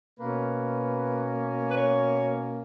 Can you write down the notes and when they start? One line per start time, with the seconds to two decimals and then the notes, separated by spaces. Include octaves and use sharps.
0.20 B2 A#3 C#4 B4
1.71 B4
1.77 C#5